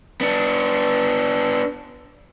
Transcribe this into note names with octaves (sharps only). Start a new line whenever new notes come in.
B3 D4